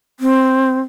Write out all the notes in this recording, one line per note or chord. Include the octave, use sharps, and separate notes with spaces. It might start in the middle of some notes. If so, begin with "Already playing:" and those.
C4